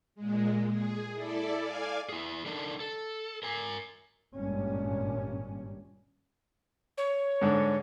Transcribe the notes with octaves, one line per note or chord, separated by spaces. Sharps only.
A#2 G#3
G#4
E4 A4 D5
D5 F5 G#5
E4 G#4
D4 D#4 A4 A#4
A4
A#4 G#5
G#1 G2 A#2 G3 C#4
C#5
G#2 D3